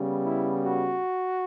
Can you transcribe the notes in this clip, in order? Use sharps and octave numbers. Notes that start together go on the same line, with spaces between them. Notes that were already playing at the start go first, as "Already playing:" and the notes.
Already playing: C#3 G3 B3
E4
F#4